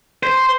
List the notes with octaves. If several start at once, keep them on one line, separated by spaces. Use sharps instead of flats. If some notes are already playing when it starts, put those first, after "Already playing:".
C5